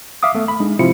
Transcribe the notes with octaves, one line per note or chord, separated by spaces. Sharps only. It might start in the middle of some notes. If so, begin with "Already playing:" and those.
E5 F5 D6 D#6
A3 B3
B5
G#3 D4 D#4
C3 F3 C4 E4 F4 C#7